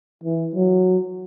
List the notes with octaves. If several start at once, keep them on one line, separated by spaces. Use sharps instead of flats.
E3
F#3